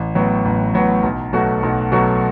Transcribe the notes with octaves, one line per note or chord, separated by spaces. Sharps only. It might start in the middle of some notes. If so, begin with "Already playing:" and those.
Already playing: A1
A2 F#3 B3
A1
A2 F#3 B3
B1
B2 F#3 A3 F#4
B1
B2 F#3 A3 F#4